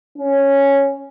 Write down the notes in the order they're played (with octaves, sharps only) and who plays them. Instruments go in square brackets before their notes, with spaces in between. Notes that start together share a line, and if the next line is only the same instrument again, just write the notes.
[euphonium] C#4